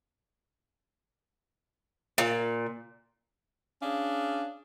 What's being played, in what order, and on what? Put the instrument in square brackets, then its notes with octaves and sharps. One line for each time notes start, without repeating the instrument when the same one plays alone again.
[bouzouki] A#2
[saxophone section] C#4 D4 G#4 F5